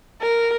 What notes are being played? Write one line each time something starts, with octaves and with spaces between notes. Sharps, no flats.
A#4